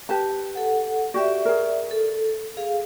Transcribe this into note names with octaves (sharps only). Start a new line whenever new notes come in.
G4 B4 A5
A4 F#5
F#4 G4 D5 E5
G#4 A#4
A4
G#4 F5